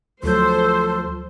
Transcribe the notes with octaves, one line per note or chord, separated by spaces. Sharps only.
D2 F3 F#3 A4 C5 G6